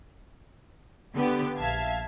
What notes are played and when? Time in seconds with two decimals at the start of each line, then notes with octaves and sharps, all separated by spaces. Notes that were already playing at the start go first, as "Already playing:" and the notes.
1.15 D3 B3 G4
1.58 A#1 E5 F5 A5 G#6